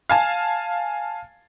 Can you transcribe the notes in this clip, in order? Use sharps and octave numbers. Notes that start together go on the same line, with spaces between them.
F5 G#5 A5